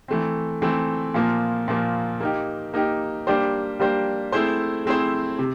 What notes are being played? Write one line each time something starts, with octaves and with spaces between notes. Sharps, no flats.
E3 A3 C4
E3 A3 C4
A#2 F3 A#3
A#2 F3 A#3
A#3 D#4 G4
A#3 D#4 G4
G3 A#3 D4 G4 C5
G3 A#3 D4 G4 C5
A3 C4 E4 G#4 C5
A3 C4 E4 G#4 C5
C3